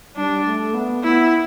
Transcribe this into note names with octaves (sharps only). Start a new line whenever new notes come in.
G3 D4
A3
B3
B3 E4